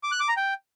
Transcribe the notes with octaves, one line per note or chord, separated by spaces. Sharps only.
D6
F#6
D6
A#5
G5